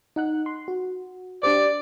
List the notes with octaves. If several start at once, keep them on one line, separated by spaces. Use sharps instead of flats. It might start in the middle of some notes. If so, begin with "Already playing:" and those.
D#4 F#5 F#6
C6
F#4
D4 G4 C5 D5